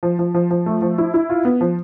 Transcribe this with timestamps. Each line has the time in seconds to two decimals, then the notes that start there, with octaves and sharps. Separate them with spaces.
0.03 F3
0.19 F3
0.34 F3
0.51 F3
0.66 A3
0.82 F3
0.98 E4
1.14 E4
1.30 F4
1.45 B3
1.61 F3